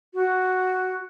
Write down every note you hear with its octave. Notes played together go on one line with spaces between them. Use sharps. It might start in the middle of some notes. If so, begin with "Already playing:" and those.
F#4